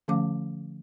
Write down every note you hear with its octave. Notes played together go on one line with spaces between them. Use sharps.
D3 F3 A3 C#4 F5 D6